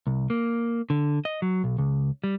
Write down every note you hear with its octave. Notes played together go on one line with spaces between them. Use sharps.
C2
A#3
D3
D#5
F#3
B1
C#2
G3